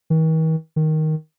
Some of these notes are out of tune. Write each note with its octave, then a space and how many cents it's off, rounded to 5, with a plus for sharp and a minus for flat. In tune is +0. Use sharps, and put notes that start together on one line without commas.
D#3 +45
D#3 +5